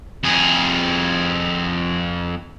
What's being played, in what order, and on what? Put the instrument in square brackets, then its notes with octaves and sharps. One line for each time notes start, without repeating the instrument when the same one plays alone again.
[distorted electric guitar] F2 G#4